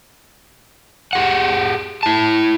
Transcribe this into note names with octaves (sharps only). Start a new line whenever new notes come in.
G4 G#4 F#5
E4 A5